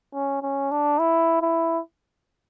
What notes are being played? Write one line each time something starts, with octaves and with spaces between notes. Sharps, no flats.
C#4
C#4
D4
E4
E4